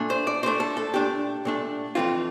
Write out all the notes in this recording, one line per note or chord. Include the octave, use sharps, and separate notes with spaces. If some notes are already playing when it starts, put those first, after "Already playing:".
Already playing: A#2 A3 D4
C5
D5
A#2 A3 D4 C5
A4
A4
A#2 A3 D4 G4
A#2 A3 D4
F2 E3 A3 C4 F4